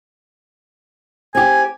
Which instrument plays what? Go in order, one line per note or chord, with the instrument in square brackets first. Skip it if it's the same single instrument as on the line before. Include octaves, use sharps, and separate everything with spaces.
[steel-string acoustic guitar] C4 G4 [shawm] G#5